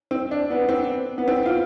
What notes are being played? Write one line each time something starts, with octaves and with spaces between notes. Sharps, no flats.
C4
D4
B3
C4
B3
C4
F4